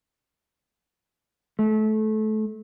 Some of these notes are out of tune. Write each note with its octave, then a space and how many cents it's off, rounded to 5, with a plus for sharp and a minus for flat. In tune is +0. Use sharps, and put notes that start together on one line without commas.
A3 -25